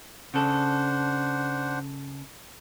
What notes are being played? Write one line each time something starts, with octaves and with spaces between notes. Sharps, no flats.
C#3 D4 A4 C5 F#5